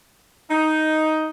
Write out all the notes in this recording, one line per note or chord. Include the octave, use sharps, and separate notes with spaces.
D#4